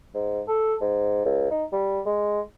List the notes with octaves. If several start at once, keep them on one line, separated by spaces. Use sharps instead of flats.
G#2
A4
G#2
C#2
D#4
G3
G#3